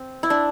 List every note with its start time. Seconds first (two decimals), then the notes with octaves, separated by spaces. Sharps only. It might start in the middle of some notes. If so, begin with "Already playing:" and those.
Already playing: C4
0.23 E4
0.30 D4